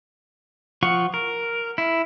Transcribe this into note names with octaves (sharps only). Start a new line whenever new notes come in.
F3 F4 F#5 C#6
A#4
E4